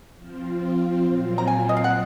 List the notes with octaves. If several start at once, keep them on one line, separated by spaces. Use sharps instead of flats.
F3 C4 F4
A#2 F#3 C4 F4
A#5
G#5
D#5
F5
F#5